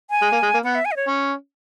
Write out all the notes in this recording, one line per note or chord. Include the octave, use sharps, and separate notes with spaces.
G#5
G#3
A#3
G#3
A#3
B3 F#5
E5
G#5
D#5
C#5
C#4